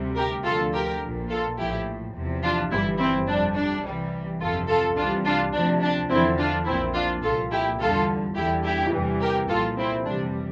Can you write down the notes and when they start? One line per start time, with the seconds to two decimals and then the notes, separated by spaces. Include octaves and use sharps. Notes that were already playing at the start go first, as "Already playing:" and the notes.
Already playing: D2 C3 G3
0.16 G4 A#4
0.45 D2 D3 F3 F4 A4
0.73 G4 A#4
1.02 A#1 A#2 F3
1.29 F4 A4
1.58 A#1 A2 F3 E4 G4
2.15 E2 C3 F3
2.43 D4 F4
2.71 G1 G2 E3 G3 C4 E4
2.99 C4 E4
3.27 F2 C3 G3 D4
3.56 D4
3.84 C2 C3 E3 G3
4.41 G1 F2 C3 F3 F4 A4
4.69 F4 A4
4.97 C2 C3 E3 G3 D4 F4
5.26 D4 F4
5.54 D2 C3 F3 D4
5.82 D4
6.10 E2 D3 F3 C4 E4
6.38 D4 F4
6.66 A#1 A#2 F3 C4 E4
6.95 D4 F4
7.23 C2 A#2 F3 F4 A4
7.52 E4 G4
7.80 E2 D3 G3 F4 A4
8.36 E2 D3 G3 E4 G4
8.65 E4 G4
8.93 E2 C3 E3 G3
9.22 G4 A#4
9.49 C2 A#2 F3 F4 A4
9.78 C4 E4
10.06 F2 C3 E3 G3 D4